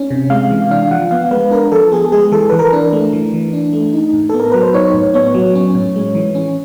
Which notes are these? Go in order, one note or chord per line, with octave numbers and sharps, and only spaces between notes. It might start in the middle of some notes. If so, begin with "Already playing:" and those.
Already playing: C#4
C3
G#3 F5
E3
D4 F5
F3 F#5
B3 F5
G#3 B4
D4 A#4
F3 A4
B3 G#4
G#3 G#4
E3 A4
E3 B4
A#4
D4
A3
E3
E3
D4
A3
D#4
A2
B3 A4
A#4
F#3 B4
C5
D#4 C#5
A2
B3 C#5
F#3
C#4
A2
G#3
E3
C#4